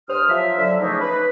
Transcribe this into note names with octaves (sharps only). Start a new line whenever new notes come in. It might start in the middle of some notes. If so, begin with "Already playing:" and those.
G2 C5 D#6 F6
F3 F#3 E5
D3 F#3 E5
C#3 E3 F3 A3 A#3 D#4
B4